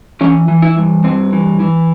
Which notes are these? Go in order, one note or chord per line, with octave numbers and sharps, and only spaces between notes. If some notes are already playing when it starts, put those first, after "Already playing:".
E3 C#4
E3
E4
G2
G2 C4
E3
E3